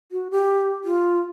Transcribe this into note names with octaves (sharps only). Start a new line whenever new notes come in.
F#4
G4
F4